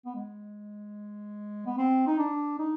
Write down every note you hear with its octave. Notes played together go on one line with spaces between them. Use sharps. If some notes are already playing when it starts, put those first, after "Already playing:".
B3
G#3
B3
C4
D#4
D4
D#4